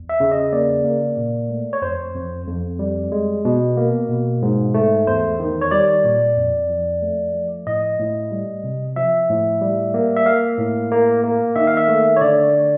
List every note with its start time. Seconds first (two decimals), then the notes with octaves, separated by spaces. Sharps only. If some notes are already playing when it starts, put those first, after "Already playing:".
Already playing: E2
0.09 E5
0.20 C#3
0.31 D#5
0.53 A#3 D5
0.85 A#3
1.17 A#2
1.50 A3
1.73 C#5
1.82 F2 C5
2.15 F2
2.47 F2
2.79 G3
3.12 G#3
3.45 B2
3.77 A#3
4.09 B2
4.42 G#2
4.74 A3
5.07 E2 C5
5.40 D#3
5.61 C#5
5.71 G3 D5
6.04 A#2
6.37 F2
6.69 F3
7.02 A3
7.34 F3
7.66 A2 D#5
7.99 A2
8.32 G3
8.64 C3
8.96 F3 E5
9.29 A2
9.61 G3
9.94 A#3
10.16 E5
10.26 A#3 F5
10.58 A2
10.92 A#3
11.24 A#3
11.56 D#3 E5
11.67 F5
11.77 E5
11.88 A3
12.16 C#5
12.21 D3 D5